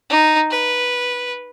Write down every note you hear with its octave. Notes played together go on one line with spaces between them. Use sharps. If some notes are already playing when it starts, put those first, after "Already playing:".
D#4
B4